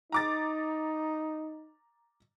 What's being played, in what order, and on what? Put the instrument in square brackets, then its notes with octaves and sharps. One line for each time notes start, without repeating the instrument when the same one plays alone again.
[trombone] D#4 [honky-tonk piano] A#5 D6 A6